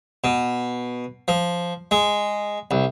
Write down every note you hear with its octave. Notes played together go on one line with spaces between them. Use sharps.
B2
F3
G#3
C2